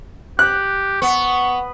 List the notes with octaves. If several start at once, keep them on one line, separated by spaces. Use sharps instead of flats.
G4 F#6
B3 C#6